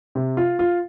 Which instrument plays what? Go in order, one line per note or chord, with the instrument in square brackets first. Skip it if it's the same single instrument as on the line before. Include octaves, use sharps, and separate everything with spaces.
[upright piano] C3
F4
F4